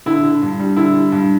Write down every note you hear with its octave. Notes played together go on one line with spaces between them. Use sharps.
D3 E4
D3
G2
G3
D3 E4
G3
G2